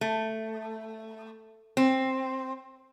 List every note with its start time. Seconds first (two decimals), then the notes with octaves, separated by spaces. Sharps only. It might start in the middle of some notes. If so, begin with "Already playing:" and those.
0.01 A3
1.77 C4